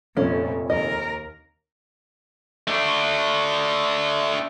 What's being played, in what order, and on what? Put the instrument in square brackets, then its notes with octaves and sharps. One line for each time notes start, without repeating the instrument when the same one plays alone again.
[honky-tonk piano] F1 F2 C#5 [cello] A#2 [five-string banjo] C#4
[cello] D#2 A#4 [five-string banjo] D#5
[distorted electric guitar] A3 D4